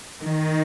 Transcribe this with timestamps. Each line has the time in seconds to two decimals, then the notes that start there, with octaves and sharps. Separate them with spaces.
0.22 D#3